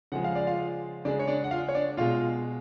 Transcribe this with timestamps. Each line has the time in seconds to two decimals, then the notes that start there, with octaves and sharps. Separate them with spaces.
0.12 C#3 F3 G#3 F#5
0.24 F5
0.35 D5
0.47 F4 F5
1.05 C#3 G#3 D4 D5
1.19 C#5
1.28 D4 D5
1.44 F#5
1.51 F4 F5
1.69 C#5
1.75 D4 D5
1.97 B2 G#3 F4 F5